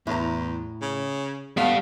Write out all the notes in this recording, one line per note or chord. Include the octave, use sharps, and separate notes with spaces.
E2 A2 A#5
C#3
G3 A3 B3 F5